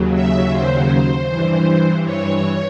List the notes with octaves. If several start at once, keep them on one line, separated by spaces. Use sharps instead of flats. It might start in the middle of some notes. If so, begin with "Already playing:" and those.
Already playing: D#2 C#3 F#3
E5
C5
G2 E3
C#5